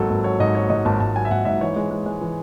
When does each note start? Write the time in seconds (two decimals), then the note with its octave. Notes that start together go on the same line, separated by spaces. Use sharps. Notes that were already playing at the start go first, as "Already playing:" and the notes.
Already playing: G#1 F#3 A4
0.10 G#1
0.24 F#3 C#5
0.40 G#2 D#5
0.55 F#3 C#5
0.70 G#2 D#5
0.85 G#1 A5
1.00 G#1 A5
1.15 F#3 G#5
1.25 E5
1.31 G#1 F#5
1.45 G#2 E5
1.61 E3 C#5
1.76 G#3
1.91 G#3
2.06 G#3
2.21 E3